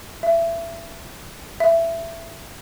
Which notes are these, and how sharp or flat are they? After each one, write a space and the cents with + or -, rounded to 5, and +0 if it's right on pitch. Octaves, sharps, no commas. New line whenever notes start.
E5 +25
E5 +15